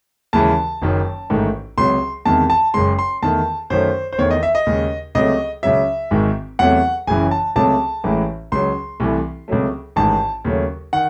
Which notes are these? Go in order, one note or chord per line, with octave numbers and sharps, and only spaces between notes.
D#2 C#3 E3 G#3 A5
F#1 F#2 D#3 F#3
A1 G#2 D#3 A3
C#2 C3 F#3 C6
E2 C3 D#3 G#3 A5
A5
F#1 F#2 C#3 G#3 C6
C6
E2 D#3 A3 A5
F#2 D#3 F#3 A3 C5
C5
E2 D#3 A3 C#5
D#5
E5
D#5
D#2 C#3 G#3
C#2 C3 F#3 A3 D#5
C#2 C#3 F#3 E5
G#1 G#2 D#3 G#3
E2 C3 F#3 A3 F#5
F#1 F#2 C#3 E3 G#5
A5
C#2 C3 F#3 A3 A5
A1 A2 E3 G#3
C#2 C#3 F#3 C6
C2 C3 E3 A3
C#2 C3 F#3 A3
A1 G#2 D#3 A5
D#2 C#3 F#3 A3
D#3 F#5